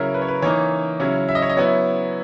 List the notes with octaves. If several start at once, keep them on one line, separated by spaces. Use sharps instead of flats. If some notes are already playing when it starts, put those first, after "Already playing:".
Already playing: C#3 F#3 C#4 E4 A#4
B4
C#5
B4
E3 A#3 D#4 C#5
C#3 F#3 C#4 E4
E5
D#5
C#5
D#5
F#3 B3 E4 C#5